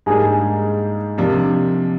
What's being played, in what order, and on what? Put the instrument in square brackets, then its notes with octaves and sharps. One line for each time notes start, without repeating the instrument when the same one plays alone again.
[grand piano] G#2 G3 A#3 D4 [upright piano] G#4
[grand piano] C3 F3 A#3 D4